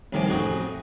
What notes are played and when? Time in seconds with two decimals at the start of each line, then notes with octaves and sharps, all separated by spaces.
0.13 C2 A2 D#3 F3 G#5 D6
0.28 A1 F2 F#4 G#4 D#5 G5